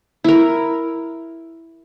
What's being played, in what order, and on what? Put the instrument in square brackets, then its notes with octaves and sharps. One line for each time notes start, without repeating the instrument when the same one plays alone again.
[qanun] E4 A#4